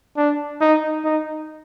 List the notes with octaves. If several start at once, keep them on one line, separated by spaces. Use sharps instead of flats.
D4
D#4
D#4